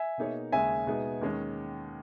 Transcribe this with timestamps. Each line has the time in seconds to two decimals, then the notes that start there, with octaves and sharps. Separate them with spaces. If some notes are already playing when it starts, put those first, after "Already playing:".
Already playing: E5 G#5
0.18 B2 A#3 D#4 G#4 C#5
0.52 D#2 C#3 G#3 C#4 E5 G#5
0.87 B2 G#3 B3 D#4 G#4
1.21 D#2 D#3 G#3 C#4